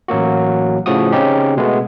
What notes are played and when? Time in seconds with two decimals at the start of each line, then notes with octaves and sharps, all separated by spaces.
0.08 A1 F#3 A#3 F#4
0.86 A2 C#3 F3 A3 F#4 D#6
1.12 C#3 C4 C#4 D#4 G4
1.57 B2 G#3 A3 B3